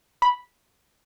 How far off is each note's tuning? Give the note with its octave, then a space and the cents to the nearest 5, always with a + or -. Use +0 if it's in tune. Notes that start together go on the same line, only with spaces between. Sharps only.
B5 -5